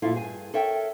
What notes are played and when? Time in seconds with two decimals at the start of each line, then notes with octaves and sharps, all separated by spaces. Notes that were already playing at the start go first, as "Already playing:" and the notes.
0.02 F2 A#2 A3 E4 F4 A4
0.14 G2 G#4 G#5
0.54 A4 A#4 C#5 E5 G5